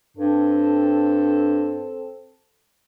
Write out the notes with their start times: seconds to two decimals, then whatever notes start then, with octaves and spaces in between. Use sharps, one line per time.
0.17 G2 C4 A4